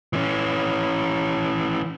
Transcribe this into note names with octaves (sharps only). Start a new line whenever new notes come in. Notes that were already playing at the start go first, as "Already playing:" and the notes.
E3 C#4